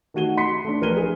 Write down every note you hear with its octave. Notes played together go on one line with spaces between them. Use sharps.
D#3 A3 F#4 D#7 G7
C6 B6 C#7
A3 D4
A#1 A#4 B4 D#7 G7
G#4